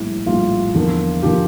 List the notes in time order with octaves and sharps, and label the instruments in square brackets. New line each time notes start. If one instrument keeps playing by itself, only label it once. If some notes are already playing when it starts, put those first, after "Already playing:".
Already playing: [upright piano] A#1 A2 G3 E4
A#1 A2 G3 F4
E2 D3 F3 A#3
D3 F3 A#3 G4